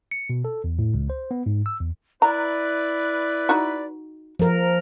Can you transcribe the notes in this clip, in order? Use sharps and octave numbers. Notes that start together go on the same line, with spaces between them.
C#7
B2
A4
E2
A2
C#2
C5
B3
G#2
E6
E2
E4 B4 D5 A#5
D#4 F#4
F3 A#4